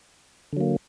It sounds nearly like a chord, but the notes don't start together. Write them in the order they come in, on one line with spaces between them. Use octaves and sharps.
D3 F#3 A#3